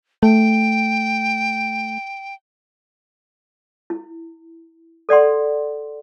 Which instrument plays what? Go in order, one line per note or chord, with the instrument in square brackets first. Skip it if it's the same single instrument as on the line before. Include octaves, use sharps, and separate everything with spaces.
[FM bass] A3 [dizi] G5
[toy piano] E4
A4 D5 F#5 C6